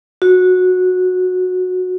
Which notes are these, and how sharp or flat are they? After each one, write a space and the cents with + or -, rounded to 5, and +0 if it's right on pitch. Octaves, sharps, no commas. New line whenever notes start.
F#4 -15